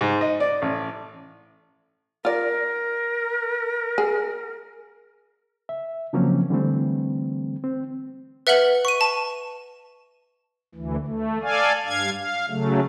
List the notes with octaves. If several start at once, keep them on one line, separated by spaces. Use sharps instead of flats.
G#2
D#5
D5
A1
F4 A#4 D5
G#4
E5
C#3 F3 F#3 A#3 C4 C#4
D3 E3 G3 A3 C4
C4
B4 E5 F#5 F6 F#7
C#6 D#7
A5
D2 E3
A3
A4 D5 F5 G#5
G2 F5 G#6
F5
C#3 F#3 A3